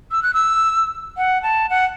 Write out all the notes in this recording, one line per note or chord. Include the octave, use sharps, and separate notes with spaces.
E6
F#6
E6
F#5
A5
F#5